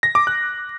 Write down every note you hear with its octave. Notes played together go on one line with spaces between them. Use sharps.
A#6
D6
F#6